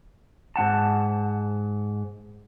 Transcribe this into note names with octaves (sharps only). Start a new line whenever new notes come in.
G#2 A3 F#5 A5